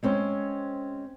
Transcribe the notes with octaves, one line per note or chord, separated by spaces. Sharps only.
G#3 C4 C#4 C5